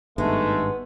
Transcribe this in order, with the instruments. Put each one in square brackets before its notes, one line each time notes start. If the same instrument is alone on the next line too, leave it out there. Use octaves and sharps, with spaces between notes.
[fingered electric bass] G#1 G2 [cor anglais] G#3 [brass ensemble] A3 D#4 [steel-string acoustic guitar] B3